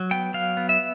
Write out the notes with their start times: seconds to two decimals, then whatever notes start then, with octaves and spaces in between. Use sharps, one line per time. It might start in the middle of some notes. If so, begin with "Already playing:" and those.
Already playing: F#3
0.11 B3 G5
0.34 F#3 F5
0.57 B3
0.69 E5